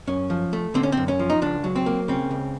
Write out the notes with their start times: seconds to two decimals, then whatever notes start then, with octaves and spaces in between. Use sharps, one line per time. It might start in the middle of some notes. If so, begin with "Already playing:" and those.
0.07 F#2 C#4
0.30 F3
0.53 A3
0.74 D3 C4
0.83 C#4
0.92 F#2 C4
1.08 C#4
1.19 F3
1.30 D#4
1.42 C#2 D4
1.64 F#3
1.76 C4
1.86 A#3
2.08 C#3 C4
2.31 C#2